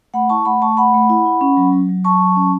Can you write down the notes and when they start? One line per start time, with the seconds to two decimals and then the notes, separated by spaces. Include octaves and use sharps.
0.14 A3 F#5 B5
0.29 E4 A5 C#6
0.45 A3 F#5 B5
0.62 A3 A5 C#6
0.77 A3 F#5 B5
0.94 A3
1.10 E4
1.26 E4
1.41 C#4
1.57 F#3
1.73 F#3
1.89 F#3
2.05 F#3 A5 C#6
2.20 F#3
2.36 C#4